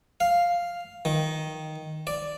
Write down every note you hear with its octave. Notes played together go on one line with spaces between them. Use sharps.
F5
D#3
D5